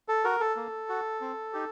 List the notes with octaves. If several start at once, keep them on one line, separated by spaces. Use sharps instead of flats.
A4
F#4 A#4
A4
A#3
F#4
C4
D#4 G4